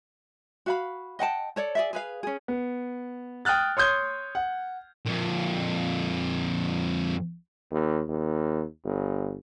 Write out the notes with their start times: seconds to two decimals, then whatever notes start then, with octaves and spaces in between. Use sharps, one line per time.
0.66 F#4 F5 B5
1.19 D#5 F#5 G5 A5
1.56 A4 C#5 D5
1.75 G#4 D5 E5
1.93 G#4 B4 F5
2.23 C#4 G#4
2.48 B3
3.45 G5 D#6 F6 F#6 A6
3.77 C#5 C6 D#6 G6 G#6
4.35 F#5
5.06 F2 A#2
7.71 D#2
8.09 D#2
8.84 G1